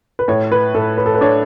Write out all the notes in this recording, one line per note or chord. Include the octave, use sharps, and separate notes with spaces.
B4
A2 C#5
B4
A2 A4
B4
A4
B4
D4 C#5